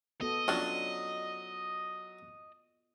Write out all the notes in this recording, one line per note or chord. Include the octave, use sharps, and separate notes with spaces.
B3 F#4 A4 D#5
F#3 C#4 D4 F4 D5 C6